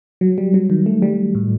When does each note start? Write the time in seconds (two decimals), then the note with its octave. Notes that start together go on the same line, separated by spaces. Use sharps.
0.21 F#3
0.38 G3
0.54 F#3
0.70 D#3
0.86 A3
1.02 G3
1.35 A2